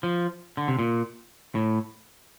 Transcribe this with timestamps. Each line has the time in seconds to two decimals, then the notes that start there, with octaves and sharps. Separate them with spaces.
0.03 F3
0.57 D3
0.68 C3
0.79 A#2
1.55 A2